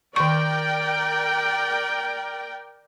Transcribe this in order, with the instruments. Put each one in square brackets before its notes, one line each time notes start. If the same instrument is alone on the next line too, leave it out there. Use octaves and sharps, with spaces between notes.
[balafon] D#3 C#6 [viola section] A#4 D5 G5